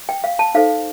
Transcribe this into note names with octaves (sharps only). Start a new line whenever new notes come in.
G5
F5
A5
D#4 A4 C5 F5